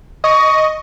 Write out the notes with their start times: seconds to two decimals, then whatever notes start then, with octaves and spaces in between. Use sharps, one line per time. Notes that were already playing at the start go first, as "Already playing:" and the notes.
0.24 D#5 C#6